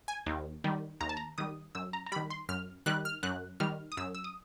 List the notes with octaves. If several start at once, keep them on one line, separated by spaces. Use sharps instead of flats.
G#5
D#2
D#3 G3
D#2 A#5
A5
A#5
D#3 G3 D#6
F#2 E6
A#5
A#5
D#3 G3 B5
C6
F#2 F6
D#3 G3 F#6
F6
F#2 F#6
D#3 G3 F6
D#6
F#2 E6
E6
D#6